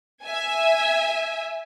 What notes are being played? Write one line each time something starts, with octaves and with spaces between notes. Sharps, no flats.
E5 G#5